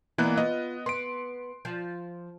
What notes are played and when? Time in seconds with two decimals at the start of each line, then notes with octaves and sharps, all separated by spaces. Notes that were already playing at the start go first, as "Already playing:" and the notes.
0.18 E3 A#3 B3 F4 D#5 F#6
0.38 B3 F4 D#5
0.86 B3 C6 D7
1.65 F3